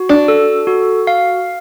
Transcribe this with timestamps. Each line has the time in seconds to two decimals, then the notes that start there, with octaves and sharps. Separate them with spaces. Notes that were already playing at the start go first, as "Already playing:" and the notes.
Already playing: F#4
0.09 D4
0.28 A4
0.67 F#4
1.07 F5